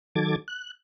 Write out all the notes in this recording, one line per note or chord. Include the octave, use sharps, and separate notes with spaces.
D#3 F#3 A4 D6 G#6 A6
F#6